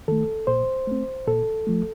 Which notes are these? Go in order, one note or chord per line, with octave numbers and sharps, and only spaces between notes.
D#3 A3 A4
A#2 C5
A3 C4
A#2 A4
F3 A3